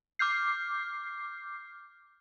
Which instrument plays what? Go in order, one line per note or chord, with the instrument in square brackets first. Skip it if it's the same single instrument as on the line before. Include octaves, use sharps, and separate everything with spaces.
[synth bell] D6 F6 G6 C7